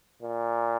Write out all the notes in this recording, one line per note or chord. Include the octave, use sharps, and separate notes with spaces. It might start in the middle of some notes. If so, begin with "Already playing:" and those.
A#2